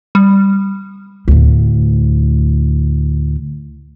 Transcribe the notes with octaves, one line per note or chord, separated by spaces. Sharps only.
G3
D2 A2